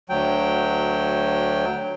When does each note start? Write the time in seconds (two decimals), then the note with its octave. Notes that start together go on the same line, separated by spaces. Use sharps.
0.10 D2 F#3 G5